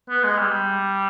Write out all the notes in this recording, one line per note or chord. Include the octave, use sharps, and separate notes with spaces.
B3
G#3
G3